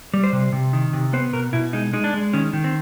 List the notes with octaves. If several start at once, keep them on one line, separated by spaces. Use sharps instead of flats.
G3
C5
C3
C3
D#3
C3
B3 C5
B2 A#4
B2 E4
G#3 D#4
G#3 D#4
D4
G#3
D#3 C#4
D#3
C4